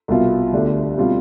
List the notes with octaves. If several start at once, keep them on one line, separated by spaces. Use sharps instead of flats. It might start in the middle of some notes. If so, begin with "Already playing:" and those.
C2 B2 B3 F4
D2 D3 A3 D4 G4
B2 G3 C4 F4